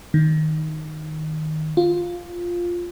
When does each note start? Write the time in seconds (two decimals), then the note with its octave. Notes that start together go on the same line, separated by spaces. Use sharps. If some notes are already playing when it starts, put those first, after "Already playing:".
0.14 D#3
1.77 F4